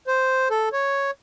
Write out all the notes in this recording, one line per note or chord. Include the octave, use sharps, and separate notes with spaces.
C5
A4
C#5